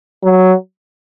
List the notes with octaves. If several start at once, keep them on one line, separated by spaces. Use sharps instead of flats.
F#3